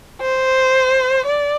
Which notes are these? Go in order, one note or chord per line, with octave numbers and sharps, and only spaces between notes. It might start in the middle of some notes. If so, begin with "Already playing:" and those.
C5
D5